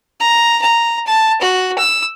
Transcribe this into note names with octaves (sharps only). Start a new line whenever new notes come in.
A#5
A#5
A5
F#4
E6